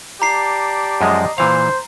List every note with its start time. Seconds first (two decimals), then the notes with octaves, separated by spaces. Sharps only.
0.22 G4 D5 A5 A#5 C7
1.01 F#2 F3 G#3 D#5
1.38 A#2 E3 C5 F5